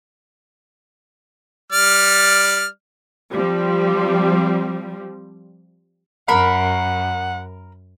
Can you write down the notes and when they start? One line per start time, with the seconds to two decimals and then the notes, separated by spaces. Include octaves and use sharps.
1.72 G3 D5 F6
3.34 F3 G3 C4
6.28 F#2 A#4 F#5 B5